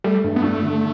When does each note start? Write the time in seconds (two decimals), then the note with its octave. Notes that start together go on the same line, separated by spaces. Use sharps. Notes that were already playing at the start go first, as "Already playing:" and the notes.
0.04 G3 A3
0.24 G2
0.36 B3
0.43 A3 D4
0.63 D3